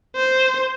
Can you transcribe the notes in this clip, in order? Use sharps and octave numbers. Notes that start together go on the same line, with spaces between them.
C5